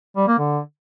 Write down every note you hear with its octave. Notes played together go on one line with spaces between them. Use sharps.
G3
A#3
D3